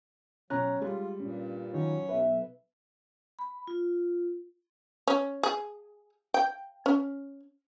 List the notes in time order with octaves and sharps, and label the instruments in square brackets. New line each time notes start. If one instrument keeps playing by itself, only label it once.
[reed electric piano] B2 A#5 F#6 [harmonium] F#3 [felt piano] C#4
[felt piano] G3 [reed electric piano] G#3 [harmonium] F4
[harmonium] G2 A#2 [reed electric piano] C#4
[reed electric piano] D#3 D#4 F4 [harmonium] F#3 C#4 C#5
[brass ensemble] B1 E5 [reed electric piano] B4
[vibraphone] B5
F4
[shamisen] C#4
G#4
G5
C#4